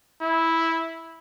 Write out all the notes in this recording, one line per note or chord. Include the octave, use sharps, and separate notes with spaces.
E4